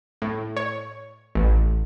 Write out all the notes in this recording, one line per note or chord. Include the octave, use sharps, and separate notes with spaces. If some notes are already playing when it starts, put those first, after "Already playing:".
A2
C#5
A1